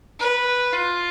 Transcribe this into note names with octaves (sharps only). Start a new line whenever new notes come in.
B4
F4